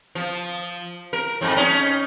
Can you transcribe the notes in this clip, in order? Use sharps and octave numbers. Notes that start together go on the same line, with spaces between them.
F3
A#4
F2 G#2
C#4 D#4